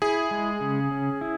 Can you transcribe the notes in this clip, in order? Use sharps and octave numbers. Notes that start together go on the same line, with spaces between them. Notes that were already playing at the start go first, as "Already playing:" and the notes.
E4 G#4
G#3
C#3
C#4
E4